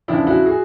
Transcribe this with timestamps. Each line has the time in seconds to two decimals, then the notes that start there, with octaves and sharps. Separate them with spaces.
0.08 E2 C#3 F3 D4 E4
0.27 E4 F#4
0.46 F#4 G#4